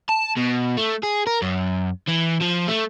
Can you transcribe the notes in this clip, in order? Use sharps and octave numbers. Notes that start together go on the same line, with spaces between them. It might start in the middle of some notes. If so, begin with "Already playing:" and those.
A5
B2
A3
G#4
A#4
F#2
E3
F3
A3